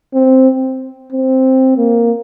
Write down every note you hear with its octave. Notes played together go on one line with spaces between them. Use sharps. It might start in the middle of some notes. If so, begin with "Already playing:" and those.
C4
C4
A#3